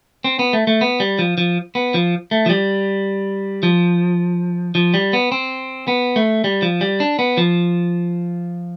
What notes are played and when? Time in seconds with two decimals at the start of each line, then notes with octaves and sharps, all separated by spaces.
0.24 C4
0.39 B3
0.53 A3
0.67 A3
0.81 B3
1.00 G3
1.19 F3
1.38 F3
1.75 B3
1.94 F3
2.31 A3
2.46 F3
2.50 G3
3.63 F3
4.75 F3
4.94 G3
5.13 B3
5.32 C4
5.88 B3
6.16 A3
6.44 G3
6.62 F3
6.81 G3
7.00 D4
7.19 B3
7.37 F3